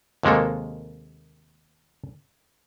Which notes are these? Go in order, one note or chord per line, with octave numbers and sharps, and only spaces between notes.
D#2 C3 G#3 A#3 A4